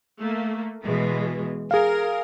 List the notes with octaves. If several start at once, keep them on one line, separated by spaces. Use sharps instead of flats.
A3 A#3
B2 E3 G#3
G#4 A#4 F5